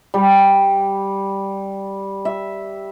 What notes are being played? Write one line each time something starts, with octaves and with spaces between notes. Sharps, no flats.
G3
E5